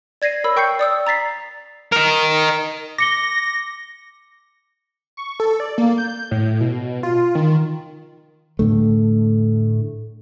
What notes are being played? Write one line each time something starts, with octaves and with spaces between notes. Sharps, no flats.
D5 G#6 A#6 C7 D#7
A#4 C#5 B5 E6
A#4 G5 C#6 G6 C7 C#7
D5 D#6 E6
A#5 A6 B6 C7
A#4 D#5
D6 A#6 C#7 G7
C#6
A4
D5
A#3
G6
A2
B2
F4
D#3
A2 D3 A3